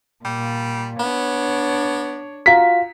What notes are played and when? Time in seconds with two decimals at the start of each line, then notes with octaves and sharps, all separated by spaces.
0.25 A#2 G3
0.99 B3 D4 C#5
2.46 F4 F#4 A#5 B6